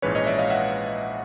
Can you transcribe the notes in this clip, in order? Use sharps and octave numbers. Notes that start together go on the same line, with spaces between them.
A#1 G#2 E3 G#3 C#4 B4 C#5
C#5 D#5
D5 E5
D#5 F5
E5 F#5